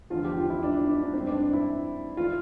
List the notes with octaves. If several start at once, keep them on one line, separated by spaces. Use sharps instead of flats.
E2 D3 F3 F4
G4
F4
E4
D4
D4
D4
D4
G2 E3 C4
D4
D4
E4
E3 F4